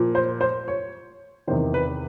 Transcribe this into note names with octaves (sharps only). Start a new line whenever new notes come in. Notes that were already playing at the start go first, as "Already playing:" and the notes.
Already playing: A#2 F3
C5
C5
C#5
E2 C3 D#3 C5
B4